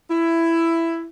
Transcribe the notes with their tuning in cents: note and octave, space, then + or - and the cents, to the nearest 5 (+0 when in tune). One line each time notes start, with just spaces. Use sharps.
E4 +10